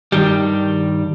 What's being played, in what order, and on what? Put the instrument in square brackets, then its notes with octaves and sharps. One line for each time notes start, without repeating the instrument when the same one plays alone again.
[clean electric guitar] G2 D#3 G3 G4